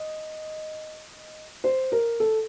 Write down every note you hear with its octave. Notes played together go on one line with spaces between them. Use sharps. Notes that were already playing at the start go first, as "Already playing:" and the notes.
Already playing: D#5
C5
A#4
A4